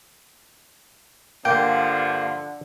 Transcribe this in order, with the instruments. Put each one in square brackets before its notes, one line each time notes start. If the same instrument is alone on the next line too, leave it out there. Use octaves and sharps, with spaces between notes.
[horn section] G2 F3 [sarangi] D3 [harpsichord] A#3 [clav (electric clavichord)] G5